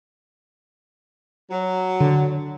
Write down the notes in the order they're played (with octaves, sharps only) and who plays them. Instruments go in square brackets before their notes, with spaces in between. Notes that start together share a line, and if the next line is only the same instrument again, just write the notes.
[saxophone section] F#3
[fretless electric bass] D3